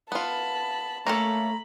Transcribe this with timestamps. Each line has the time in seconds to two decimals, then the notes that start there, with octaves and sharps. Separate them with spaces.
0.12 B3 F4 A5 B5
1.07 A3 A#3 C#4 A4 A#5 B5